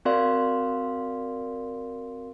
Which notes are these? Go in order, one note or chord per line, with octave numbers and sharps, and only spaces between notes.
C4 F#4 A#4 D5 F5 C6